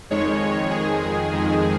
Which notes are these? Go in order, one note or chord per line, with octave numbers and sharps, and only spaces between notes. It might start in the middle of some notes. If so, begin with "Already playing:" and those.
F2 D#3 G#3 C#5
G#4
F2 D#3 G#3